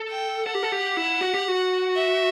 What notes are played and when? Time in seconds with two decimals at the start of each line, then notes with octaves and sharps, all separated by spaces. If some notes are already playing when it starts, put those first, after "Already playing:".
Already playing: A4
0.09 G5
0.47 A4 F#5
0.55 G4
0.63 A4
0.72 G4
0.97 E4
1.21 F#4
1.34 G4
1.48 F#4
1.96 E5